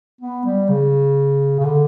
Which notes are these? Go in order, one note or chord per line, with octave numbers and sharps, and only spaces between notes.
B3
G3
C#3
C#3
D3